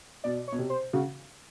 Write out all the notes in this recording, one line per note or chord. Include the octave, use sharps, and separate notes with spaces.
B2 D5
C#5
B2
C3
C5
C#3 F#4